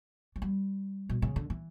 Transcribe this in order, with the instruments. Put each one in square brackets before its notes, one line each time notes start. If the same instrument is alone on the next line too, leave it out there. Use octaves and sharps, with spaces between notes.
[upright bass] F#3
G3
B2
C#3
D3
E3